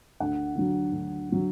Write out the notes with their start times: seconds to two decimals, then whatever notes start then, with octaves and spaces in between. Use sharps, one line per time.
0.20 D2 F#5
0.56 D3 F#3
0.92 D2
1.29 D3 F#3